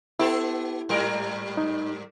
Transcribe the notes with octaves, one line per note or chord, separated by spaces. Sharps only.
B3 E4 G4 A4
G#2 G3 A#4
D#4